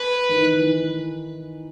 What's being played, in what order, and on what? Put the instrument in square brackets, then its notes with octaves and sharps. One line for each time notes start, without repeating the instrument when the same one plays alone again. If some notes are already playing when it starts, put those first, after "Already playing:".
Already playing: [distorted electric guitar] B4
[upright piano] D#3
E3
E3